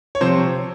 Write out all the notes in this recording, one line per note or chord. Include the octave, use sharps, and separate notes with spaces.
C#5
C3 F3 C5